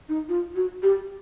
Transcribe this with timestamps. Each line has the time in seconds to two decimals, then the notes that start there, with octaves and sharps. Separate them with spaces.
0.09 D#4
0.29 F4
0.55 F#4
0.83 G4